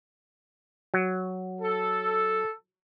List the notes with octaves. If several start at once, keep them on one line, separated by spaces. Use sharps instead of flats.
F#3
A4